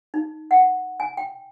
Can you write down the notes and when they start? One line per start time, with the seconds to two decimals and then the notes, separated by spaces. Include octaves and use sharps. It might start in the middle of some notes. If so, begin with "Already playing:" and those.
0.14 D#4
0.51 F#5
1.00 G#5
1.17 G5